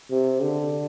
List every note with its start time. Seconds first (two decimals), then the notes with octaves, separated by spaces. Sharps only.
0.10 C3
0.42 D3